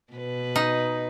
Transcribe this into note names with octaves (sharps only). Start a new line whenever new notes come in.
B2 B4
D#4